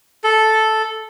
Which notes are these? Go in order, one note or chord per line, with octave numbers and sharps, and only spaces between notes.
A4